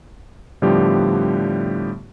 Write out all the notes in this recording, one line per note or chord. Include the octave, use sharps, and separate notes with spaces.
A2 D3 F3 G3 B3 G4